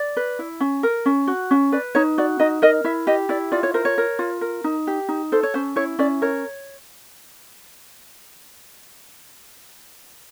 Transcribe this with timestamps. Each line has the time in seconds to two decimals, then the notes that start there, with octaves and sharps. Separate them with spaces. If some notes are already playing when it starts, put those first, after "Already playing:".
Already playing: D5
0.17 B4
0.39 E4
0.60 C#4
0.83 A#4
1.06 C#4
1.27 F#4
1.51 C#4
1.72 B4 D5
1.95 D#4 C#5
2.18 F#4 D5
2.40 D#4 D#5
2.62 A#4 D#5
2.84 E4 E5
3.07 G4 D#5
3.29 E4 D5
3.52 F4 D5
3.63 C#5
3.74 A#4 C5
3.85 C#5
3.98 A#4
4.19 F4
4.41 A#4
4.64 D#4
4.87 G4
5.09 D#4
5.32 A4 C5
5.43 C#5
5.54 C#4 C5
5.76 E4 C#5
5.99 C#4 D5
6.22 A#4 C#5